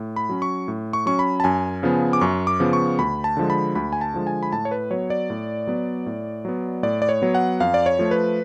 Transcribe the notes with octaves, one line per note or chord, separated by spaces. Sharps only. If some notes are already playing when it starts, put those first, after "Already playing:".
Already playing: A2
B5
F#3 C#4
C#6
A2
C#6
F#3 C#4 C#6
B5
A5
F#2 G#5
C#3 F3 B3
D6
F#2 C#6
D6
C#3 F3 B3
C#6
D2 B5
A5
D3 F3 G#3
B5
D2 B5
G#5
A5
D3 F3 G#3
G#5
B5
A2 A5
C#5
B4
F#3 B3 C#5
D5
A2
F#3 B3
A2
F#3 B3
A2 D5
D5
C#5
F#3 B3
F#5
F2 F5
D5
C#5
F3 A3
B4